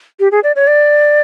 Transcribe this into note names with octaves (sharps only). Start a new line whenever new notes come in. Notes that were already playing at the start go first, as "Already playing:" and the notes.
G4
G#4
D5
C#5
D5